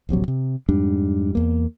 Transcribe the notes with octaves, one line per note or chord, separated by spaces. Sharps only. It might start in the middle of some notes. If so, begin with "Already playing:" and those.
D1 A#1 C3 F#3
C3
F2 G#2 G3 D4
E2 A#3